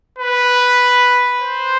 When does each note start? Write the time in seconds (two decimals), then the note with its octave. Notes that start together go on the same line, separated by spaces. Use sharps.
0.18 B4
1.40 C5